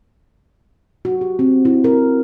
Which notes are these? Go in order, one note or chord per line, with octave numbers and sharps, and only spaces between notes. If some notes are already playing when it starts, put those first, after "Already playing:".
F#4
G4
C4
E4
A#4